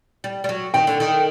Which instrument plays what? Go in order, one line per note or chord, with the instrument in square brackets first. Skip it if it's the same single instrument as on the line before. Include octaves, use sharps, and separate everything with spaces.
[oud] G3
G3
F#3
[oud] D#3 [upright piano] G5
[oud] D3
D#3